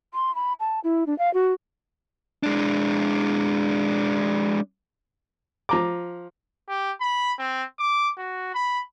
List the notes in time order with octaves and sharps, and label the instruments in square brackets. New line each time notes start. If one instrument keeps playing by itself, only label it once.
[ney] C6
B5
A5
E4
D4
F5
F#4
[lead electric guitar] G#3 D4
[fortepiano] F3 A#5 D6
[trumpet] G4
B5
C4
D6
F#4
B5